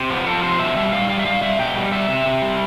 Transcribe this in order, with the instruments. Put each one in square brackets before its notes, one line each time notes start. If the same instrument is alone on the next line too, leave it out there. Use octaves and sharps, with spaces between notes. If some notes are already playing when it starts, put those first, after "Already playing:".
Already playing: [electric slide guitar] C3
F3 B3
F3 A4
C3 C5
B2 E5
G3 E5
G3 F5
G3 F5
E5
G3 F5
G3 E5
B2 G5
G3
G3 E5
C3
C3
G3